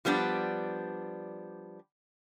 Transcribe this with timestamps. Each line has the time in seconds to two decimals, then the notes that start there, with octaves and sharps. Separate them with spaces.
0.05 F3 G3 B3 D4